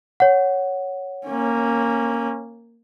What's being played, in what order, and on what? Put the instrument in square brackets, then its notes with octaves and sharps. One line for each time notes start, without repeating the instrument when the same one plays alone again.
[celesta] C#5 F#5
[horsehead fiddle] A#3 C#4